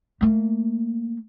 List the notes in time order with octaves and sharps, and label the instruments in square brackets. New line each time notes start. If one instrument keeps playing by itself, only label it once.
[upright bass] A3 A#3